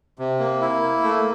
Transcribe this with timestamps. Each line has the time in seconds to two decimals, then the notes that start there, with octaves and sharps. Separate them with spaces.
0.19 C3
0.40 A#3
0.61 E4
0.82 A#3
1.03 A3